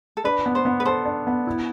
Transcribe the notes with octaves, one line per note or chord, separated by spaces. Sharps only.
A4
D4 B4
B3
C5
B3
B4
A4 C5
D4
B3
E4